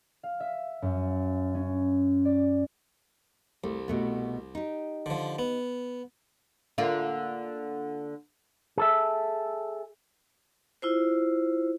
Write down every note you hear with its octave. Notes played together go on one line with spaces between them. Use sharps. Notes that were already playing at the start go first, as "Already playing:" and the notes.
F5
E5
F#2
C#4
D5
C2 A3
B2 A3 B3
D#4 G4
D3 F3
B3
D3 A#3 F4
G#4 A4 E5
E4 F4 C5